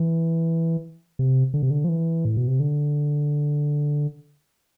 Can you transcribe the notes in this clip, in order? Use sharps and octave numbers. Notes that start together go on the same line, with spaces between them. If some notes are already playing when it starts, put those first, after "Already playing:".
Already playing: E3
C3
D3
C3
D3
F3
E3
A2
B2
C3
D3